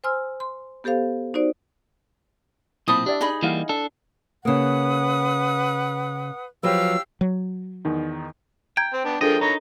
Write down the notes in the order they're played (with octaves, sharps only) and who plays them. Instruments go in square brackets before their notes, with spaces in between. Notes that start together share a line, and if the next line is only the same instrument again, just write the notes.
[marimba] C5 G#5 C6 E6 F6
C6
B3 G4 A4 C5 F5
D#4 F#4 C5 D5
[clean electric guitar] B1 A#2 C4 [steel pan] E4 A5 B5 [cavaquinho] D#6
[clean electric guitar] D4 [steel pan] G4 D5 E5
[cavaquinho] D#4 G#4 B5
[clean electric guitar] E3 G3 A#3 [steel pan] E4 F5 F#5
[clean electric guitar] D4 A4
[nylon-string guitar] C#3 A#3 [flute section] B4 F#5 D#6
[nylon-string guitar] F3 F#3 B4 [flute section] G4 F5 E6
[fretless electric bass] F#3
[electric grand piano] E2 D#3 D#4
[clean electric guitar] G5 [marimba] A#5 G#6
[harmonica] C4
B3 D4
[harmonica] F3 G#3 G5 [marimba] D4 A4 A#4 [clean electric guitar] D#5
[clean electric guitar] D#4 [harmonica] C#5 A#5 B5